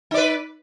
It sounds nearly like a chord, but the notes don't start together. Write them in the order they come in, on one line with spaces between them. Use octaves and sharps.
D#4 D5 B4